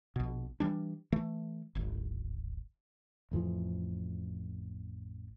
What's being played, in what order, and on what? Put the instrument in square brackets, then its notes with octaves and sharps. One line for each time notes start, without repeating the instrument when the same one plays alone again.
[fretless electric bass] A#1 B2
E3 F3 G3 D4
E3 A3
D1 G#1
A1 F2 E3 F3